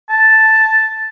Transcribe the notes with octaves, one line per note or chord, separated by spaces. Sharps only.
A5